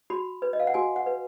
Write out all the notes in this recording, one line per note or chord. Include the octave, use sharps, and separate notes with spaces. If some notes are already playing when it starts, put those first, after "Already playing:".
F#4 B5
B4
D#5
F5
F#5
F#4 G#5
F#5
B4